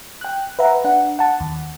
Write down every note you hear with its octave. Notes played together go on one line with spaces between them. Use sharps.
G5 F#6
B4 E5 F#5 A#5
D4 F#5
F#5 A5
D#2